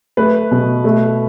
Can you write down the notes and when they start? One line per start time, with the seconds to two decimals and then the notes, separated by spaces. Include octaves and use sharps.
0.17 A3 B4
0.51 B2
0.84 A3